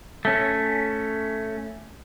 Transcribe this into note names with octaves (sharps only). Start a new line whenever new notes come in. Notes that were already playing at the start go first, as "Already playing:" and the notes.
A3 C#4